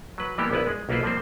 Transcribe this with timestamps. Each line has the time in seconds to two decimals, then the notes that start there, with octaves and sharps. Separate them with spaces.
0.18 F#3 B4
0.38 E3 G3 A#3 B3 E4 G4
0.51 A#1 B3 E4 B4
0.67 G#3
0.89 B1 A#3 E4 F4 B4 C5
1.03 F3 G3 A#3 C4 C5